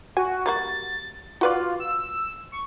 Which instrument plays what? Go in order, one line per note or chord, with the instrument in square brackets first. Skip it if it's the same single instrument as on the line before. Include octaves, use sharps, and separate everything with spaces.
[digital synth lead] F#4 [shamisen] G#5
[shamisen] G3 A#3 F#4 [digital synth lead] A6
[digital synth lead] F4 [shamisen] F#4 B4 D5
[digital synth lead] E6
C#6